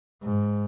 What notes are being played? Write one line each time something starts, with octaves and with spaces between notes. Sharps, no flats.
G#2